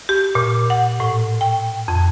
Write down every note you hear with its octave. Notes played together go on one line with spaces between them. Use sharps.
G4
A#2
F#5
A2
G5
F2